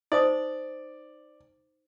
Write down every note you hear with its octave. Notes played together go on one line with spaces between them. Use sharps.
D#4 C5 D5 D#6